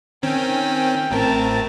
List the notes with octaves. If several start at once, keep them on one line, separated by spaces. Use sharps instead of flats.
D#3 C4 C#4 G5
A1 A2 C4 A#4 A5